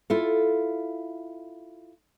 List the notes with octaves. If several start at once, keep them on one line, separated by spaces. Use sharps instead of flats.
E4 F4 A4